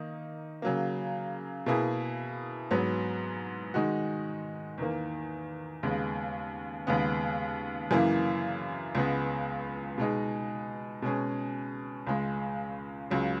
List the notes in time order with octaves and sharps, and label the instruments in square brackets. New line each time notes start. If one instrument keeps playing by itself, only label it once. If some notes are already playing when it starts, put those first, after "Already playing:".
Already playing: [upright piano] D#3 A#3 D#4
C#3 F#3 A#3
B2 A#3 E4 G#4
G#2 F#3 B3
D#3 G#3 D#4 F#4
E2 D#3 A#3
D#2 C#3 G#3 B3
D#2 C#3 G#3 B3
F#2 C#3 E3 A#3 E4
C#2 C#3 G#3 B3
B2 G#3 D#4 G#4
B2 G#3 C#4 G#4
C#2 C#3 G#3
C#2 C#3 F#3